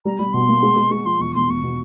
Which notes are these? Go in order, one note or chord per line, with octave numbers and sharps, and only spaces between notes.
G3 A#5
G3 B5
B2 C6
A#3
G#3
G#3
G#3 C#6
F3 C6
E1 C#6
E1 C6
E1 C#6
B2